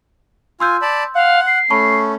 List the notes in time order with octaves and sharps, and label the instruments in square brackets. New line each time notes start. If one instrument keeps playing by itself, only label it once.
[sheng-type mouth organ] F4 G#5 [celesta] C6 E6 G6
[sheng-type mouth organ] D5 A5 B5
[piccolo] F5 [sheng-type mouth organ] F#5
[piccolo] C7
[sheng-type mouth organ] A3 C#4 [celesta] A5 B5 C#6